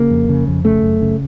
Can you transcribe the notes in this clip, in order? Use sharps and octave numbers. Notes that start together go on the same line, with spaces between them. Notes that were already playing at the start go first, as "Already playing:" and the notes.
Already playing: C#3 A#3
F2
C#3
F2
C#3 A3
F#2
C#3